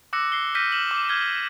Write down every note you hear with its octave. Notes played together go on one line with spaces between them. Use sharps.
D6 E6 F#6 A#6 C#7
C7 G7
F6 G6 A#6 B6 D#7
F6 E7 F#7
D6
F6 G6 G#6 G7